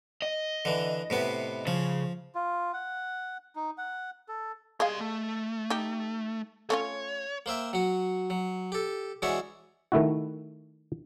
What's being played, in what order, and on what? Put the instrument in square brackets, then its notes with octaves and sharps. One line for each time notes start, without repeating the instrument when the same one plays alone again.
[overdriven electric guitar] D#5
[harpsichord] D3 E3
A2 C3 B3
[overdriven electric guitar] C#3 [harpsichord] F3
[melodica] F4
F#5
D#4
F#5
A4
[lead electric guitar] G3 C6 [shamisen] G#3 G#4 F5
[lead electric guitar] A3
[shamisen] D#4 G4
[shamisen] A3 C#4 F4 [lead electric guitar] C#5
[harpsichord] A#3 C5 E5 G5
F#3 F#4
F#3
G4 A4
E3 G#3 D4 F#4 C#5 E5
[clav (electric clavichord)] D#3 A3 E4 F#4